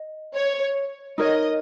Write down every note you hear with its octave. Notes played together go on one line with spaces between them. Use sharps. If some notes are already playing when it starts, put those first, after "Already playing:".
Already playing: D#5
C#5
D#4 A#4 C#5 D#5